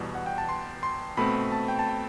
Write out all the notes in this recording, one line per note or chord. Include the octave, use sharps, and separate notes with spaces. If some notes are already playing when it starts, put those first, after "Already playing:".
Already playing: E2 B2 G3 B3
F#5
G5
A5
C6
C6
B2 A3 C4 B5
A5
G5
A5
G5